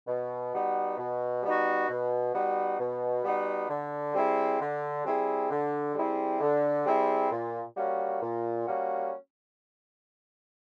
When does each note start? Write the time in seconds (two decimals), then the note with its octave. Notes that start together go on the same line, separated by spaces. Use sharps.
0.08 B2
0.53 G3 B3 D#4 F#4
0.98 B2
1.44 G3 B3 D#4 F#4
1.89 B2
2.34 G3 B3 D#4 F#4
2.79 B2
3.25 G3 B3 D#4 F#4
3.69 D3
4.15 G3 C4 E4 G#4
4.60 D3
5.05 G3 C4 E4 G#4
5.50 D3
5.95 G3 C4 E4 G#4
6.41 D3
6.86 G3 C4 E4 G#4
7.31 A#2
7.76 G3 A#3 C#4 F#4
8.22 A#2
8.67 G3 A#3 C#4 F#4